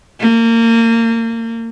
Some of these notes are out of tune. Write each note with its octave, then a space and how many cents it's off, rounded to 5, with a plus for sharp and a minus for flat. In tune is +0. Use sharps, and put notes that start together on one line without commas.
A#3 -30